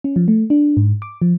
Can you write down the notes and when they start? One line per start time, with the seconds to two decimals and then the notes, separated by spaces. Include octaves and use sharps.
0.04 C#4
0.16 F3
0.28 A3
0.50 D4
0.77 G#2
1.02 D6
1.22 F3